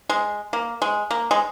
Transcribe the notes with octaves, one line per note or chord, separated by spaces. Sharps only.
G#3
A#3
G#3
A#3
G#3